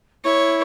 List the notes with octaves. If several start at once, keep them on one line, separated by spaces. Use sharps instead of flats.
E4 C#5